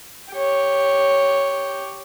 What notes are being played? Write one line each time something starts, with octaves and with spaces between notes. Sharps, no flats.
G4 C#5